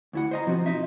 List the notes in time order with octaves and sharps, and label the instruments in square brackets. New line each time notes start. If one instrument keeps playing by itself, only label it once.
[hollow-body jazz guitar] D2 E4 F#5
C5 D#5 A#5
B2 F3 C4 F#4
D#4 D#5 E5